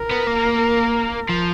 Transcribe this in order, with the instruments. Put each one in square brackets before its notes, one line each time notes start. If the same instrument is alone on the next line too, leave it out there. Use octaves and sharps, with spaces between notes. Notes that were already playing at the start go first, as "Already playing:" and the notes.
Already playing: [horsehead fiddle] A#4
[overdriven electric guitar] B3
A#3
F3